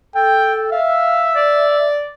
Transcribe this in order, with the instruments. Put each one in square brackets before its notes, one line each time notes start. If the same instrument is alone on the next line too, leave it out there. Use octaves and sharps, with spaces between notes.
[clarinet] A4 [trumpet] G5
[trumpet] E5 [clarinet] F5
[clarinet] D5